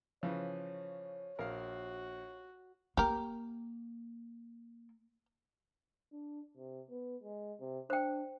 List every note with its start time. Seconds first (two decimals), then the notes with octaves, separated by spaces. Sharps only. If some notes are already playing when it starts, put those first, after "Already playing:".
0.23 C#3 E3 F3 C#5
1.39 A#1 F#4 A#4 F5
2.97 A#3 G4 A#4
6.13 D4
6.57 C3
6.90 B3
7.24 G#3
7.60 C3
7.90 D4 C5 G5